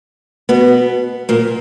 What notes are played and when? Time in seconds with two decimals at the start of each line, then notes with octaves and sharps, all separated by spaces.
0.49 B2 B3
1.29 A#2 A#3